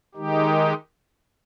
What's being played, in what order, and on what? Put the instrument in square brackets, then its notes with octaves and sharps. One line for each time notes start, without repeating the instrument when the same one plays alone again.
[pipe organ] D#3 G#3 D#4 G4